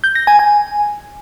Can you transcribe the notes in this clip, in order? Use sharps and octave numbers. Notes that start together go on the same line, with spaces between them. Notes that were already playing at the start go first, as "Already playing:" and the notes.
G6
A#6
G#5
G#5